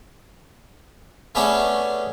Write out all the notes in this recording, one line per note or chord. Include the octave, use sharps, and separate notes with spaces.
A3 B3 C#4 D4 G#4